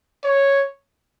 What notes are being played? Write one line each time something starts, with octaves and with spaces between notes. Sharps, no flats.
C#5